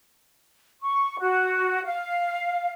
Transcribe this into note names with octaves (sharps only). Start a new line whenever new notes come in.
C#6
F#4
F5